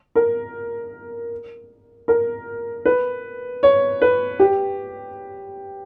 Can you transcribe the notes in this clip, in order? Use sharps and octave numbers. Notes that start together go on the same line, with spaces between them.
A#4
A#4
B4
C#5
B4
G4